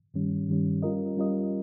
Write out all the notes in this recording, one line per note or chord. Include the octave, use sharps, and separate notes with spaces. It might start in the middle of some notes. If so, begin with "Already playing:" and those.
G2 D#3 G3 C#4
G2 D#3 G3 C#4
G3 C#4 F4 A#4 D#5
G3 C#4 F4 A#4 D#5